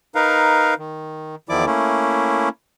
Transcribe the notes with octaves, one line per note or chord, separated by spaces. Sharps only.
D#4 A#4 B4 F5
D#3
E2 D#3 F3 E4 D5 D6
A3 A#3 C#4 E4